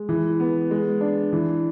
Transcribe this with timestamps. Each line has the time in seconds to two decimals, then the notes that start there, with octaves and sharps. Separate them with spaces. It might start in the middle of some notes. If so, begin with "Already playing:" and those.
Already playing: G#3
0.09 E3
0.40 B3
0.71 G#3
1.01 D4
1.33 E3